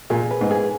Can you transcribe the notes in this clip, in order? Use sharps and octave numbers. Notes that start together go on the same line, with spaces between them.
A#2 G#4
B4
G#2
G#4